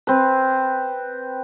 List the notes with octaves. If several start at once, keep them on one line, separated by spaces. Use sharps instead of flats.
C4 B4